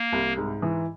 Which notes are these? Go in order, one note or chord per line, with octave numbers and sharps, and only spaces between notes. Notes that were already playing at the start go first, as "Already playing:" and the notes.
Already playing: A#3
C2
G#2
E3